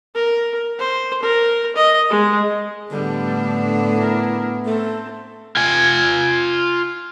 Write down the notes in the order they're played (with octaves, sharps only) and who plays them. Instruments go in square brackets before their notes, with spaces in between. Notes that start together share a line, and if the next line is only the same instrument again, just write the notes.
[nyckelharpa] A#4
C5
A#4
D#5
G#3
[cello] A2 D4 [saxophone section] D3 [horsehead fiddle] G3 [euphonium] B3
[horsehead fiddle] E4 A#4
[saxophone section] A3 [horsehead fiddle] C4 A4
[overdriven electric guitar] F4 G#5